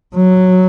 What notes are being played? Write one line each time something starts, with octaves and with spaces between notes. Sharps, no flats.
F#3